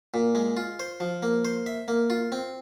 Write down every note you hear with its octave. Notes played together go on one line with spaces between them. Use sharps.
A#2
G#3
F4
C5
F3
A#3
C5
E5
A#3
F4
C4